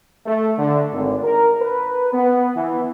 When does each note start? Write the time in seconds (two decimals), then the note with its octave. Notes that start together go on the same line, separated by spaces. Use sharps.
0.26 A3
0.58 D3
0.92 G#1
1.24 A#4
1.61 B4
2.13 B3
2.56 E3